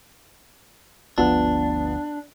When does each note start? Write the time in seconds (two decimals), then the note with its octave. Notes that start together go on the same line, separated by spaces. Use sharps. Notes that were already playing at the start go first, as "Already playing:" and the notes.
1.18 G1 D2 F3 B3 D4 F4 F#5